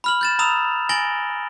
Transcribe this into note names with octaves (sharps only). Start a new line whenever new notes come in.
B5 F6 F#7
G6 A6 E7
A#5 B5 D#6 E6 E7 F7
G#5 A6 A#6 D7 F#7 G7